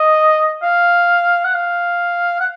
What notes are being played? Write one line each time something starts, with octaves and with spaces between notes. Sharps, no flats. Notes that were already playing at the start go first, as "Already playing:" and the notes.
Already playing: D#5
F5
F#5
F5
F#5